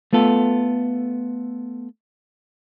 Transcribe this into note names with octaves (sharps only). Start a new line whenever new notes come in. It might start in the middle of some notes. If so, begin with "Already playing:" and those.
A3 B3 F4 A4